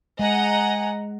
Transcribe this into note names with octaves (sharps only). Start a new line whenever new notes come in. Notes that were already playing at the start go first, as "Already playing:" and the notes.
G#3 D#5 F#5 G#5 A#5